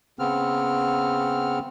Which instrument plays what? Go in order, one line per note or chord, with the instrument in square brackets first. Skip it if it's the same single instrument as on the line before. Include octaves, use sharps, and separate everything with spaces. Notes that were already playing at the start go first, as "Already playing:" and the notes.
[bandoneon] C#3 B3 C4 F6